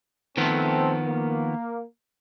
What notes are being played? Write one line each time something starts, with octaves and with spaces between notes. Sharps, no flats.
D#3 F3 A3 B3 C4 A4
A#3